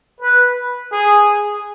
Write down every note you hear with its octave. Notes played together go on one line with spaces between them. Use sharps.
B4
G#4